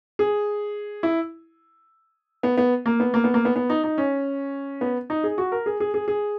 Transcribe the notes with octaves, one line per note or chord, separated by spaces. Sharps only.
G#4
E4
B3
B3
A#3
B3
A#3
B3
A#3
B3
B3
D#4
D#4
C#4
B3
D#4
G#4
F#4
A#4
G#4
G#4
G#4
G#4